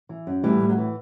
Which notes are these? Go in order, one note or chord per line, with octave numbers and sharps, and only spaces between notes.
E3
F#2
A2 E3 G3
A2
F#3
E3